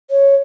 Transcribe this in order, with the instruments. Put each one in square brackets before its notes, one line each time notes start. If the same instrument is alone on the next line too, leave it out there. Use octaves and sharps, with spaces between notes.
[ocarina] C#5